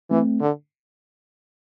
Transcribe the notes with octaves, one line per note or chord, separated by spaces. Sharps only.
E3 A3 C4
D3